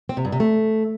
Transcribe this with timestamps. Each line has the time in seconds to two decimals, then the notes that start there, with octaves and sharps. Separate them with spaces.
0.09 C4
0.17 C3
0.25 G2
0.32 C3
0.40 A3